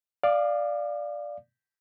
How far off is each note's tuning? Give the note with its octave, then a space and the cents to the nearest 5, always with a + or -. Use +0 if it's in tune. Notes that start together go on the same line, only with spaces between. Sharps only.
D5 +0 F5 +0 D6 +45